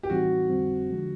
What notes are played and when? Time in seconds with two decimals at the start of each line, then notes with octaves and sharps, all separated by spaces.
0.03 G4
0.10 A2 E3 G3 C4 D#4 F#4
0.50 F2 D3 G3 C4
0.90 D3 F3 G#3